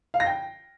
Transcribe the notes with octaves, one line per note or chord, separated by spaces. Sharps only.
F5
A#6
G5